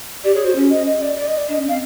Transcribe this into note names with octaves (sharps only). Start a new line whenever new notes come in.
G4 D5
G#4 C#5
F#4 C5
C#4
D#5
D#5
D5
D5
D#5
D5
D4 D#5
C#4
C4 F5